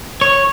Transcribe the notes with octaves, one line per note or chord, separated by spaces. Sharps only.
C#5